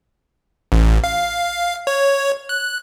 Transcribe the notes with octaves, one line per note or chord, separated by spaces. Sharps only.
A1
F5
C#5
F#6